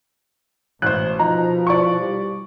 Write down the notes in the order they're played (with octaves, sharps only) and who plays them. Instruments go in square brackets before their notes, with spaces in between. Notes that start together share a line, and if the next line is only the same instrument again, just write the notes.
[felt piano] A1 C5 [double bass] B2 [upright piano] F#6
[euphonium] F3 [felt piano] D#4 [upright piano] A#5
[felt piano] E4 D5 [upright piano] C#6
[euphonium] G3